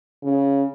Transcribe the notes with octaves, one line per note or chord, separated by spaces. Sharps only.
C#3